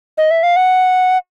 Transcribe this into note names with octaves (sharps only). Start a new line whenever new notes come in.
D#5
E5
F5
F#5